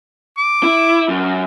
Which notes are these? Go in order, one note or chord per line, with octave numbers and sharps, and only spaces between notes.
D6
E4
F#2